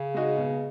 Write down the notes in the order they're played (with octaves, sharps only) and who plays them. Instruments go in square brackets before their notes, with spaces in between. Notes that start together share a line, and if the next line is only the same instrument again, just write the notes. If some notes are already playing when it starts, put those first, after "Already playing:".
Already playing: [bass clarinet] C#3
[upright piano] G#3 D#4 F#4
B2